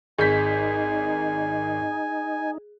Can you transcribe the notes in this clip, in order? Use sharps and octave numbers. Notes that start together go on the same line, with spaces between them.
G#1 D#4 G#4 G#5 G6 B6